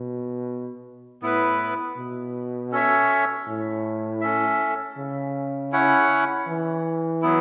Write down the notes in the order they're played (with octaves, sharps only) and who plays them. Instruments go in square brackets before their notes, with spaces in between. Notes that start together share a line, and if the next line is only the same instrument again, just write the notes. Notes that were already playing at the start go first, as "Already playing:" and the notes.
Already playing: [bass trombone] B2
[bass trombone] A2 [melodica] B3 E4 B4
[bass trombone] B2
[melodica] C#4 A4 C#5 E5
[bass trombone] A2
[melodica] C#4 A4 E5
[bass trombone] C#3
[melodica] C#4 E4 C#5 F#5
[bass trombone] E3
[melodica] F#3 B3 E4